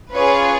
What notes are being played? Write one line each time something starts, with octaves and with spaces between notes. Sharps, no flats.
C#4 F4 G#4 B4 C#5